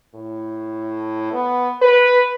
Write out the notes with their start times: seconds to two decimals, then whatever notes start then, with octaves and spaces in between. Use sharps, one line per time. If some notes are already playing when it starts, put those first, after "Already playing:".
0.15 A2
1.33 B3
1.82 B4